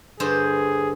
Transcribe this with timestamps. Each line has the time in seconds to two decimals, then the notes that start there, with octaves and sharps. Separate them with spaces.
0.20 G2 D3 G#4 C5